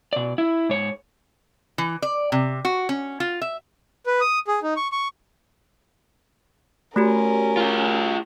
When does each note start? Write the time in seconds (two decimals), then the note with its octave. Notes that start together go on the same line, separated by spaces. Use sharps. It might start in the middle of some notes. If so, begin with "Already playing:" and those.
0.13 B2 D5
0.38 E4
0.69 G#2 C#5
1.78 E3
2.02 D5
2.32 C3
2.65 F#4
2.89 C#4
3.20 F4
3.41 E5
4.06 B4
4.21 D#6
4.48 G#4
4.63 D#4
4.77 C#6
4.92 C#6
6.96 A3 C#4 F#4 G4 A#4
7.57 F4 G#4